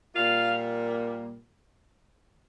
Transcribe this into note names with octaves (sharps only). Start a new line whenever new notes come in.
A#2 G3 A#3 F4 F5